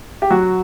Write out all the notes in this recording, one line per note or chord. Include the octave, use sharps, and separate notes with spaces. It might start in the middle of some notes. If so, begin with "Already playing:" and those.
G4
F#3 F#4